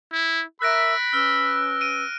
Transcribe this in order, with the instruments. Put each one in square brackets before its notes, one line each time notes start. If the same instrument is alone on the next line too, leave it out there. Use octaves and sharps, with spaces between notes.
[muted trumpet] E4
[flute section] A#4 E5 E6 [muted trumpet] B5 [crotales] F#6 A#6 D7
[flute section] C#4 B4 E6 [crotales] F6
[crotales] D7 D#7